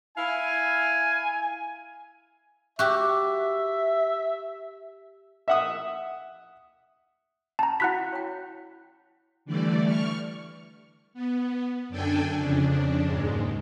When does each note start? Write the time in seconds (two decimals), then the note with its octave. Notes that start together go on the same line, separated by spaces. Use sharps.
0.17 E4 F5 G#5
2.79 F#4 G4 E5
5.48 E5 F#5 D#6
7.59 C#4 A5 A#5
7.80 E4 F#4 F#5 B5 F#6 B6
8.13 C#5 G5
9.45 D3 E3 G3 A3 D5
9.85 C#6 F6
11.14 B3
11.89 F#2 D3 D4 A4 G5 G#5
12.37 F2 C#3 D4
13.07 D#2 G#2 G#3